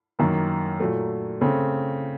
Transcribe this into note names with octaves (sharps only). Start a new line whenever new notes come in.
F#2 D#3 A#3
A#2 F#3 A3
C#3 A3 C4